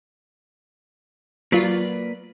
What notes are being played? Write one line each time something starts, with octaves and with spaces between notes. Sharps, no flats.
F#3 A#3 F4 B4 D5